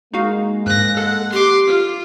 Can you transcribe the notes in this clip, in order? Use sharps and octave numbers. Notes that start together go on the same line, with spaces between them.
G#3 A#3 D#4 F#4 F5
G#2 F#6 A#6
A4 F#5
G4 C6 D6
F4